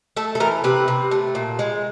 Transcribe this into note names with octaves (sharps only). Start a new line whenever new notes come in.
A3 A4
A4
E3 A#4
C3 B4
C3
A3
A#2
G#3